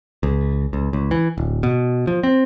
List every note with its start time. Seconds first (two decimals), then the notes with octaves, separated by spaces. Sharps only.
0.23 C#2
0.73 C#2
0.93 C#2
1.11 E3
1.38 D1
1.63 B2
2.07 F3
2.23 C4